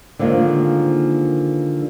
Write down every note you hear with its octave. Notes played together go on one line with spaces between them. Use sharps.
D3 D#3 F3 G#3 A#3